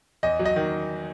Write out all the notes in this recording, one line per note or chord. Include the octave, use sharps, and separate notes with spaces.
E2 D#5
F#3
D#5
D#3